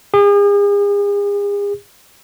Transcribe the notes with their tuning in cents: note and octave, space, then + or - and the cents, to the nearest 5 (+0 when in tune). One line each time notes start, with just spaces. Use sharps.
G#4 -40